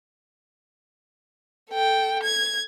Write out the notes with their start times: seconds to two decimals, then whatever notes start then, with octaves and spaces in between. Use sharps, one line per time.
1.70 A4 G5
2.24 G#6